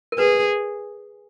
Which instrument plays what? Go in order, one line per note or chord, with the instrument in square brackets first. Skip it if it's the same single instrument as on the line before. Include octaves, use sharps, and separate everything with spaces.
[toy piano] A#4
[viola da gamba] G#4 [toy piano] B4